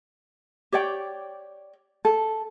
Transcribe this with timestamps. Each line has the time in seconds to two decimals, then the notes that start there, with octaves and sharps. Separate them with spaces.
0.72 G4 C#5 D5 G5
2.05 A4